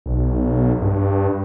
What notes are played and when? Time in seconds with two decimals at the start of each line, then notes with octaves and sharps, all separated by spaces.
0.06 B1
0.82 G2